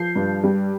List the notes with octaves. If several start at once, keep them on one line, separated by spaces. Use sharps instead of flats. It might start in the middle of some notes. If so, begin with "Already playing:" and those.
Already playing: F3 G6 C7
G2
G3